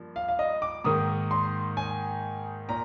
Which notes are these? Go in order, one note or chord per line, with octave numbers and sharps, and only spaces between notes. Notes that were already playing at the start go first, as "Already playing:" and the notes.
Already playing: G2 F3 A#3
F5
F5
D#5
D6
G#2 D#3 A#3 D#6
C6
G#5
A#2 A#5